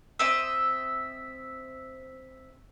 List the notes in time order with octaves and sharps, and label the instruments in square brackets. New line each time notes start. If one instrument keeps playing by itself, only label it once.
[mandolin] C4 D#5 E5